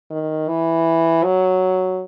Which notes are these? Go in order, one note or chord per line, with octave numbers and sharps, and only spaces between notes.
D#3
E3
F#3